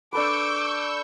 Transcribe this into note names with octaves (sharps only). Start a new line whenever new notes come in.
D4 A4 B4 C#6 D6 E6 G6